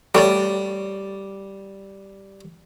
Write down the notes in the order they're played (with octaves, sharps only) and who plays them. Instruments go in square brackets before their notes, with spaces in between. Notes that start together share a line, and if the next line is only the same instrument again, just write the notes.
[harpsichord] G3 [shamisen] A3 C#5 D5